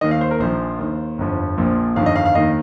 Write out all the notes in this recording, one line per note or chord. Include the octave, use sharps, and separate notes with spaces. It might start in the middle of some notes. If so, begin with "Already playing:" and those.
D#2 D#3 D#5
F5
C5
A#4
A#1 A#2 F3 C5
D#2 D#3
G1 F2 F3
A#1 A#2 F3
G1 F2 D#3 F5
D#5
F5
F5
D#2 D#3 D#5